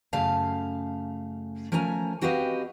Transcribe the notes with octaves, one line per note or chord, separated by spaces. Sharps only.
F#2 C#3 A3 F5 A5
F3 A3 C#4 A#4 G#5 A#5
C4 F#4 G4 B4 D#5 F5